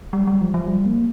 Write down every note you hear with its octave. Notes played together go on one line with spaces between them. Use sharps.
G3
G3
F3
F3
G3
A#3